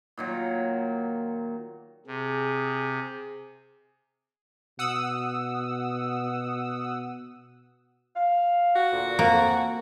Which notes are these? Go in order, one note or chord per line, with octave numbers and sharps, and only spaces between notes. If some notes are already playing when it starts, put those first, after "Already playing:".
A#2 D#3 F#3
C3 G#4
B2 F#5 D#6 E6
F5
F#4
D2 A#2
F2 A#3